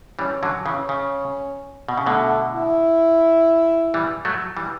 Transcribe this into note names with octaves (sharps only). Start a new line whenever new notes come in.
E3 G3 C#4
D3 F#3
C#3 E3 C#4
C#3
B2
C#3
B2 D3 A3
E4
E3 G3
F#3 A3
E3 G3